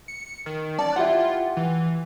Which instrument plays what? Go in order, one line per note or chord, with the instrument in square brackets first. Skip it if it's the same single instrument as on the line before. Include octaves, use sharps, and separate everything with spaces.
[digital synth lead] C#7
D#3
[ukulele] C#4 A5 [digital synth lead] D5
[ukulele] E4 G4 F#5 [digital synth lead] F4
[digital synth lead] E3